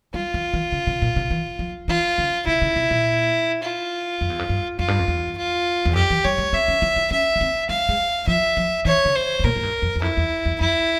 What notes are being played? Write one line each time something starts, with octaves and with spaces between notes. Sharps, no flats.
G3 F4
E3
E3
C#3
C3
A#2
C3
E3
F3
E3 F4
C#3
C3 E4
C#3
C3
A#2
F4
F2
E2
F2
G2
F2 F4
G2
F2
E2
F4
E2
F2 G4
E3
G3 C#5
G#3
C4 E5
C#4
E4
E4
C#4 E5
A#3
C4
G#3 F5
G#3
F3 E5
F3
E3 C#5
C#3
C5
G#2
A#2 A#4
G#2
G2
F2
E2
F2 E4
E2
E2
F2 E4